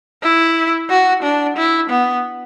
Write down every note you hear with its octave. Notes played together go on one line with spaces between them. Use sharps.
E4
F#4
D4
E4
B3